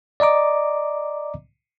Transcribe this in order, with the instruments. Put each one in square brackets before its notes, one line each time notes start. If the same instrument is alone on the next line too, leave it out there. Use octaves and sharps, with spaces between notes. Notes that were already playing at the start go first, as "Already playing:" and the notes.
[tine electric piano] D5 D#5 A#5 D6